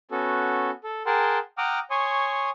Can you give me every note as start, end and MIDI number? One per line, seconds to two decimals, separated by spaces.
0.11 0.70 59
0.11 0.70 61
0.11 0.70 66
0.11 0.70 69
0.84 1.03 69
1.06 1.38 68
1.06 1.38 70
1.06 1.38 78
1.06 1.38 79
1.06 1.38 81
1.06 1.38 84
1.58 1.79 78
1.58 1.79 79
1.58 1.79 82
1.58 1.79 86
1.58 1.79 87
1.58 1.79 89
1.91 2.50 73
1.91 2.50 80
1.91 2.50 84
1.91 2.50 85
1.91 2.50 87